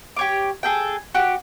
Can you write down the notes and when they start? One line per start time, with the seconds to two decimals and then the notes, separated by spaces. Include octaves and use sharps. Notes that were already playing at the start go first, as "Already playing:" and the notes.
0.17 G4 C#5 D6
0.63 G#4 A4 G5
1.14 F#4 G4